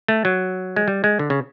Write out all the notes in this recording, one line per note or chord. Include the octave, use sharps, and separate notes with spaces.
A3
F#3
G#3
G3
G#3
D3
C#3